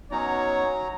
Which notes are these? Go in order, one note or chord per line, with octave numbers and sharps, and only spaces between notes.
F#3 B3 C#4 D#4 C#5 A#5